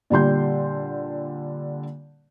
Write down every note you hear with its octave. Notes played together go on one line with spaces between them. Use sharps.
A#2 D3 G3 C6 G6